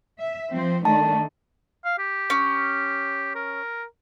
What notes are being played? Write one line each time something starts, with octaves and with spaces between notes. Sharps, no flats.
E5
F3 C4 C5
D#3 A3 D4 A5
F5
G4
C#4
A#4